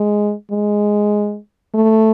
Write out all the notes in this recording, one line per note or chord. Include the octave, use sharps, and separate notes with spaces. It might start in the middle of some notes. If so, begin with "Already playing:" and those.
Already playing: G#3
G#3
A3